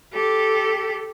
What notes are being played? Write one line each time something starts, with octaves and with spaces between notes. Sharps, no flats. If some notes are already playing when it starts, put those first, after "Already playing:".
G4 A4